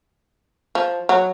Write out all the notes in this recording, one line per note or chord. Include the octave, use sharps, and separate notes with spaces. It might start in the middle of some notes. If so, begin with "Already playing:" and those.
F3
F#3